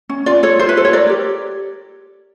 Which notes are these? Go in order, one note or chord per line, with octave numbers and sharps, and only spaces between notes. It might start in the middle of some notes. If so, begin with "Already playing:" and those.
C#4
F4 D5
A4 C#5
F4 C5
B4
A4 C5
C#5
A#4 D5
G4